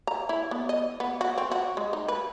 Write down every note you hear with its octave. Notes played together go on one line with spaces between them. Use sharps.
A#5
E4
B3
D#5
B3
F#4
C4
F#4
G#3
D#4
B4